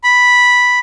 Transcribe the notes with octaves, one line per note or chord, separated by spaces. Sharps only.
B5